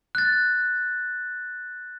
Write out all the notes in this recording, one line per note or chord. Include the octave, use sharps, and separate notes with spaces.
F#6 A6